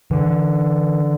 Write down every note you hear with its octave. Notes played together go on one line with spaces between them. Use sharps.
D3 E3